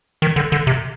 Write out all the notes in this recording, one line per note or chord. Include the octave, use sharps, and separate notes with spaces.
D#3
D3
D3
C3